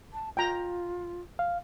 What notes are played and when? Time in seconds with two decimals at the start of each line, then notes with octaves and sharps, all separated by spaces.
0.13 A5
0.37 F4 G5 A#5
1.39 F5